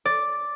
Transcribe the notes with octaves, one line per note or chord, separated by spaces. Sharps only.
D5